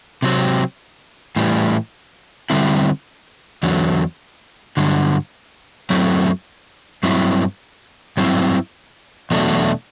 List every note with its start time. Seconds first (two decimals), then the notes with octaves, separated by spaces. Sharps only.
0.22 C3 F#3 C4
1.36 A2 E3 G3
2.50 D3 G3 C4 E4
3.63 E2 D3 F#3
4.77 G2 D3 F#3
5.90 F#2 F#3 A3 C4 E4
7.03 G2 F#3 C4 E4
8.17 G2 F#3 C4 E4
9.31 E2 B2 F#3 A3 D4